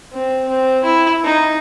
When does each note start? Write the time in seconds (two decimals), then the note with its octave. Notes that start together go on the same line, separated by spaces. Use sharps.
0.13 C4
0.49 C4
0.84 E4
1.25 D#4